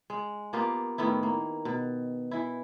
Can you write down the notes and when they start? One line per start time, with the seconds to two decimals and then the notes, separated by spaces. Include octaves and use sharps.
0.10 G#3
0.53 A#3 B3 F4 G4
0.98 A2 D#3 B3 E4
1.23 A#3
1.65 B2
2.31 E3 E4